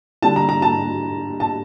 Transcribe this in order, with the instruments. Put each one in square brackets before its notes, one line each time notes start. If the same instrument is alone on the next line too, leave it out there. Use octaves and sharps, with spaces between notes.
[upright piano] D3 G3 D4 A5
A#5
A#5
A5
A5